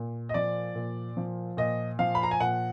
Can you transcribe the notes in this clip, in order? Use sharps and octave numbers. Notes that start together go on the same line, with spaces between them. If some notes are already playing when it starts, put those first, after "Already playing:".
Already playing: A#2
D#5
F3 D5
A#2
F3
A#2 D#5
F3 F5
B5
A#5
G#5
A#2 F#5